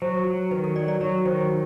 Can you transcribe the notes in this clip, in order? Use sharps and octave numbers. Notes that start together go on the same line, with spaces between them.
F#3 C5
F#3
D#3 B4
A4
F#3 D5
D5
F#3 C#5
D#3 C5